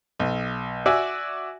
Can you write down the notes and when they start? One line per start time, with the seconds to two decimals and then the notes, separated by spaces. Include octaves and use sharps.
0.19 B1
0.86 F#4 D5 E5 G#5